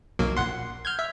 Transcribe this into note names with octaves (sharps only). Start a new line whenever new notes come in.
B1 F#3 A#3
A#1 F#5 C6
F6 G6 G#6
E5